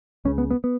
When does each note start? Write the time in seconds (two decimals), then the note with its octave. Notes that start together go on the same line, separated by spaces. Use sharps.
0.25 C#2 C#3 C#4
0.38 B3
0.51 B3
0.64 B3